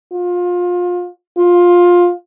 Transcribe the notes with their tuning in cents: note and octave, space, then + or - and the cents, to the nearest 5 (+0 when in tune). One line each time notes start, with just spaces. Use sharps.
F4 +25
F4 +15